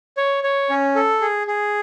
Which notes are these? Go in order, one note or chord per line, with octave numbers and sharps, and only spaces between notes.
C#5
C#5
C#4
A4
G#4
G#4